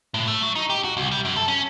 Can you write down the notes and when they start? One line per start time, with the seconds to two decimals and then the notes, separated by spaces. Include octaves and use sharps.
0.14 A2
0.28 A3
0.43 F#3
0.55 D#4
0.70 G4
0.84 F#4
0.97 C2
1.11 G3
1.25 F#2
1.37 A4
1.48 C#4